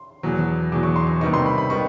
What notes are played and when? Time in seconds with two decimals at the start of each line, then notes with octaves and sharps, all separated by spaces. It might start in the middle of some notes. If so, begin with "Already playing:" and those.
Already playing: C6
0.23 E2 B2 F#3
0.72 E2 B2 F#3 D6
0.83 C#6
0.96 C6
1.07 C#6
1.21 C3 D#3 G3 B3 D#4 C#6
1.34 C6
1.46 B5
1.58 B5
1.69 D#3 G3 B3 D#4 C#6